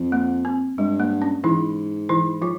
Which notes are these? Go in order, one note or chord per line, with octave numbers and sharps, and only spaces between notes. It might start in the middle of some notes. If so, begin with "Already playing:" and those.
Already playing: F2
A#3
C4
G2 G#3
A#3
C#4
G#2 E3 E4
E3 E4
F3 F4